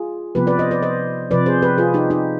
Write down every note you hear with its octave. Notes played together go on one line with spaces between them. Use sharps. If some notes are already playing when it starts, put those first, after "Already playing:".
Already playing: F4 G#4
C3 F3 B3 G4 B4
B4 D5
C5 D#5
B4 D5
C5 D#5
C3 F3 C4 B4 D5
G#4 C5
G4 B4
F4 G#4
D#4 G4
D#4 G4